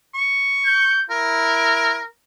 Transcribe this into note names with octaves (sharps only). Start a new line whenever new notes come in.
C#6
G6
E4 A#4